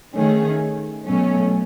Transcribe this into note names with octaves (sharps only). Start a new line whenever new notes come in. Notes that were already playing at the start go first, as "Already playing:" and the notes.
D#3 A3 C#4 G#4
B2 F#3 A3 C#4